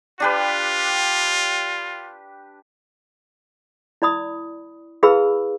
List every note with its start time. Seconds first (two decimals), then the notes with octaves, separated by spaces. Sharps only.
0.20 D4 F4 G4 B4
4.02 E4 D5 B5 D#6
5.03 E4 G#4 B4 F5 B5 E6